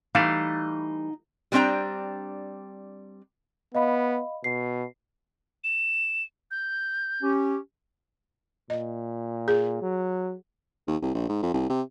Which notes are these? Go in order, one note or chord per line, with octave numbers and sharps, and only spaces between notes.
E3 G3 A3 D#4 F5
G3 B3 C4 D4 G5 A#5
B3 D#5 F5 B5
B2 C7
E7
G6
C#4 G4
A#2 D#5
G#4
F#3
D#2
C2
A#1
G#2
F2
C2
C3